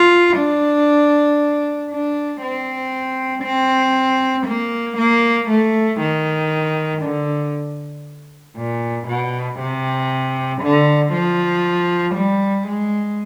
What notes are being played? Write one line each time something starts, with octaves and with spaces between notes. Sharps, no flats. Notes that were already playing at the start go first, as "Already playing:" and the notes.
Already playing: F4
D4
D4
C4
C4
A#3
A#3
A3
D#3
D3
A#2
B2
C3
D3
F3
G3
G#3